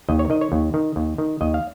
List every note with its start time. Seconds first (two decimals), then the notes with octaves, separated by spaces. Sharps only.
0.09 D#2 D#5
0.19 C#5
0.30 D#3 D#5
0.41 C#5
0.52 D#2
0.74 D#3
0.96 D#2
1.18 D#3
1.41 D#2 D#5
1.54 F5